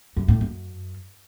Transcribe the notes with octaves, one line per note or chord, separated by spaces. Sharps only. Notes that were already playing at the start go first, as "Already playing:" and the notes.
F#2
A2
F#2